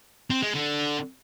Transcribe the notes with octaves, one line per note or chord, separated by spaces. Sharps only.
C4
G#3
D3